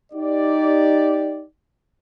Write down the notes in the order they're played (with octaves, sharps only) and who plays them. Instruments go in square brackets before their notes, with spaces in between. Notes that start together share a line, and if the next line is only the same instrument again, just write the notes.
[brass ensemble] D#4 G4 D5